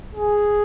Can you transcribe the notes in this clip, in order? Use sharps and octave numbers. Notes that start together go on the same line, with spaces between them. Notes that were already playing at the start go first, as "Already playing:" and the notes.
G#4